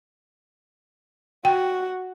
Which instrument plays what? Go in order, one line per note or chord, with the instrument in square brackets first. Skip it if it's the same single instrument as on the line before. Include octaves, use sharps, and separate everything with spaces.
[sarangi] F#4 [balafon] G5